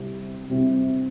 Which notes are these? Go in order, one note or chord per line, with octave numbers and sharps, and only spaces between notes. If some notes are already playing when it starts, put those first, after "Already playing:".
Already playing: C3 G3 C4 E4 G4
C3 G3 C4 E4 G4